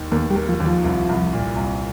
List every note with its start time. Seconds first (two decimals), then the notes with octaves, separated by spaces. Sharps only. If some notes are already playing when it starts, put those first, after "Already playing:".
Already playing: D#2 D#3
0.12 D#2 A#3
0.31 G3
0.36 A#3
0.49 F3
0.60 D#2
0.66 F3
0.84 C2
1.09 C2
1.33 A#2
1.56 C2